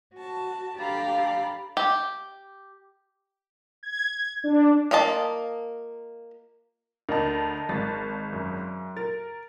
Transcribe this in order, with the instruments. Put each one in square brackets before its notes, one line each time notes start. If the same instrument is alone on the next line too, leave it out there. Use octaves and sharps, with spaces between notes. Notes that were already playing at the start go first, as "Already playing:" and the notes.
[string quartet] F#4 A5
D4 G4 A4 F5 A#5 B5
[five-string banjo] G4
[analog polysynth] G#6
D4
[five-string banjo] A#3 F4 D#5 A5
[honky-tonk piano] D2 [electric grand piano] A#4 D#5 A5
[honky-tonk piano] G#1 A6
[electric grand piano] F#2
[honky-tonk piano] A#4 [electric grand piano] A6